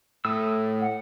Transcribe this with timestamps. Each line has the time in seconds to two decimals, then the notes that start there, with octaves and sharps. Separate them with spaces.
0.25 A2 A3 D#6 E6
0.80 F#5